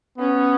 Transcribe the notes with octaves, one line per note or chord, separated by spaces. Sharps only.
B3 C#4